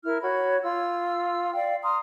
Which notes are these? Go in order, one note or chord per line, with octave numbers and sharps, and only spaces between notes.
E4 A#4 F6
F#4 C#5 B5
F4 E6
D5 F5 G5
A#5 C6 D#6 F6